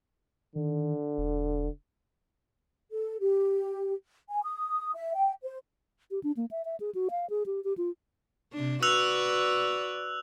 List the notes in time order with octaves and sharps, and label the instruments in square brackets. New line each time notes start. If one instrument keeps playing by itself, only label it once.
[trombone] D3 [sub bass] D#3
[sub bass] E1
[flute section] A4
G4
G#5
D#6
E5
G5
C5
[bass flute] G4
D4
A#3
E5
E5
G#4
F#4
F5
G#4
G4
G4
F4
[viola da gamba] C3 D4
[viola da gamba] F#4 B4 D5 [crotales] E6 F#6 F7